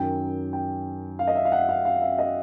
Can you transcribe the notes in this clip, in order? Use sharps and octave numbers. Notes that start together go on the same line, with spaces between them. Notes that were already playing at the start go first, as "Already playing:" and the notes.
Already playing: F#2 D#3 F#3 G5
G5
F5
D#5
E5
F5
F#5
F5
F5
E5
D#5